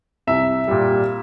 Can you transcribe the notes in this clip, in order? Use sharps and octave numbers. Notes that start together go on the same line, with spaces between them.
C2 E5
A#2 G3